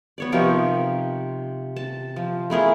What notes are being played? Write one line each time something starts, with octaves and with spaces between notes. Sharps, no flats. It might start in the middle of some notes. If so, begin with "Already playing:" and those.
B3 C#5 D5
C3 F3 D#4 A#4
A5
F3
A3 E4 G#4 A#4